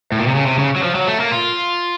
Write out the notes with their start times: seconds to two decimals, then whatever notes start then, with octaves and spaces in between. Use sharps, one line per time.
0.12 A2
0.19 A#2
0.27 C3
0.35 C#3
0.46 C3
0.58 C#3
0.76 F#3
0.83 F3
0.95 F#3
1.07 A3
1.20 A#3
1.32 F4